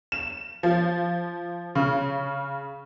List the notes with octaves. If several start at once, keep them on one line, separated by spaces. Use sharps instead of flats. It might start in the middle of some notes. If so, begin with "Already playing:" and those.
E7
F3
C#3